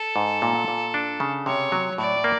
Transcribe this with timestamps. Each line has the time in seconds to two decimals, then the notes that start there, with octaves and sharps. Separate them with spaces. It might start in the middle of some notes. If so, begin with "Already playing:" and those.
Already playing: A4
0.16 G#2
0.42 A#2
0.68 A#2
0.94 D4
1.20 C#3
1.46 C3 C#5
1.72 F#3
1.98 A2 D5
2.24 A#3